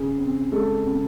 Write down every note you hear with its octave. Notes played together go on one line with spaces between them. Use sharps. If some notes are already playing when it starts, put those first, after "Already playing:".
Already playing: C#3 G#4
C4
G#3 A4
C#3